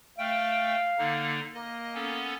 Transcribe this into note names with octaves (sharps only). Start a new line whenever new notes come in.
A3 F5 G5
D3 A#3 D#4
A#3 D#5
B3 C#4 A4